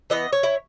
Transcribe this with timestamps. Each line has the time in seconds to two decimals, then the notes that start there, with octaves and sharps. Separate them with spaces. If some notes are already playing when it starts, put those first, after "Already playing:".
0.10 E3 B3 D#5
0.33 C#5
0.43 E4